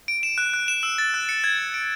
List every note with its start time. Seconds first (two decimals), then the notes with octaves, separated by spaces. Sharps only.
0.08 D7
0.23 E7
0.38 F#6
0.54 F#6
0.68 E7
0.83 E6
0.98 A6
1.14 F#6
1.29 C#7
1.44 G#6
1.59 G#6
1.74 D7